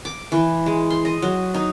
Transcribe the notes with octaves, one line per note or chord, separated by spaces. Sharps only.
D6
E3
G#3
C6
D#5
F#3
D#4